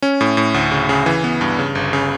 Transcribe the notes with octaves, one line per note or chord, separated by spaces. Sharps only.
C#4
A2
A2
D2
C#3
C#3
E3
B3
G2
C#3
G1
C#3